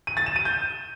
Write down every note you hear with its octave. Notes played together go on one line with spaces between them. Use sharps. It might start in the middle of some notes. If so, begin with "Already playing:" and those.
D#7
A6
E7
D#7
G6